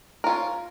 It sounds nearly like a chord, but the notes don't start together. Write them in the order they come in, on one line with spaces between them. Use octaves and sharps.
A#4 F4 C#4